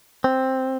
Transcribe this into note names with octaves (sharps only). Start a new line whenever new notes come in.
C4